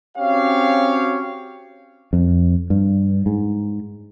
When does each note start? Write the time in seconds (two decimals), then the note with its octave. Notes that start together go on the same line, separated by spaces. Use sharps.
0.18 C4 C#4 F#4 G4 C#5 F5
2.13 F2
2.70 G2
3.26 G#2